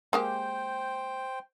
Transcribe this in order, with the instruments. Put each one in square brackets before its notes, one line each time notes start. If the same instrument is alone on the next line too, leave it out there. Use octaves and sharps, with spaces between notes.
[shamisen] G#3 A#3 G4 [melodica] C5 G5